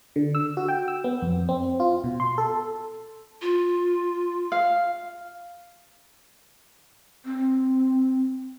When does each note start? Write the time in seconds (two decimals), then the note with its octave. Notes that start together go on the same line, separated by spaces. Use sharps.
0.16 D3
0.35 E6
0.57 F#4
0.68 G5
0.88 E6
1.04 B3
1.22 F2
1.49 C4
1.80 F4
2.04 B2
2.20 C6
2.38 A4
3.42 F4
4.52 F5
7.25 C4